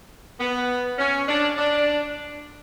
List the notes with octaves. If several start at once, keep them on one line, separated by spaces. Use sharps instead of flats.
B3
C#4
D4
D4